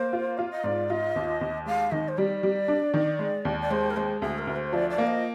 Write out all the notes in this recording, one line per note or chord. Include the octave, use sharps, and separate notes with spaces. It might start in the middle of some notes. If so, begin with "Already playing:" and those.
Already playing: A#3 C5
F4
F4 F5
D#5
G#2 D5
F4 D#5
D#2
D#2
G#3 F5
D#3 D#5
C5
G3 D5
G3
D4
D#3
G#3
D#2
D5
G#3 C5
A#4
G#3 C5
D2 G#4
A#4
D2
C5
F3 D5
D5
A#3
D#5